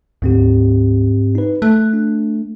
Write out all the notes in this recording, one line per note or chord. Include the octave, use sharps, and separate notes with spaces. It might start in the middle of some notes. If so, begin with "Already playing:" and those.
D2 G#2 C4 G4
D#4 B4
A3 F#6
D4